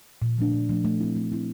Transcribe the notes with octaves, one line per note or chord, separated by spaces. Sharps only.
A#2
F3 A3 D4
A#2
F3 A3 D4
A3
C4 E4
A3
C4 E4